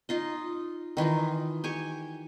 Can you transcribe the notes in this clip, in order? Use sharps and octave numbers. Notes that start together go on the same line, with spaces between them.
D#4 F4 D#5
D#3 E3 D#4 F4
G4 G#5 C#6